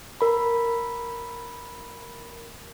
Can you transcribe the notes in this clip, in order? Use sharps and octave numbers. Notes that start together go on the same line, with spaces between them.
A#4 B5